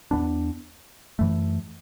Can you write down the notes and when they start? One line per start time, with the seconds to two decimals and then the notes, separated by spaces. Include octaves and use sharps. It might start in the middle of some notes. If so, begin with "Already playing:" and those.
0.11 E2 B2 B3 D4
1.19 F#2 E3 A3